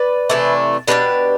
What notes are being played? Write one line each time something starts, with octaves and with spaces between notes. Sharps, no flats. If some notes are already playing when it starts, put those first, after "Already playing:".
Already playing: B4 D5
C3 E3 A3 D4
B2 A3 D4 G4 B4